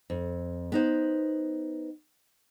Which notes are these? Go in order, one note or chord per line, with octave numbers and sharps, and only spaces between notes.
F2
B3 D#4 C5